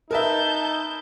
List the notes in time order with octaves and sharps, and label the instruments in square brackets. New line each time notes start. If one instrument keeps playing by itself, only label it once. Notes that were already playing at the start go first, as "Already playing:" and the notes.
[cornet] D#4 [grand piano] A#4 B4 E5 [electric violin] A5 G6